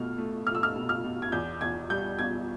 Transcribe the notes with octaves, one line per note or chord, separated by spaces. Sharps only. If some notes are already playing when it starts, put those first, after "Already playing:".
Already playing: B2 A3 F6
A3
A3 F6
E6
F6
B2
F6
B2
G#6
E2 G6
E2 G#6
G3 G6
B2 G#6